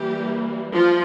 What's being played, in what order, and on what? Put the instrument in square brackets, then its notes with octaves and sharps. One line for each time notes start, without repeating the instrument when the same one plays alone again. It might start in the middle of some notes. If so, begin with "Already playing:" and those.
Already playing: [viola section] E3 G3 A#3 G4
F3 F4